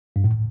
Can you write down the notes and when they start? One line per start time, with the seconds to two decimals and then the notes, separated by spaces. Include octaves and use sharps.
0.16 G2
0.24 A2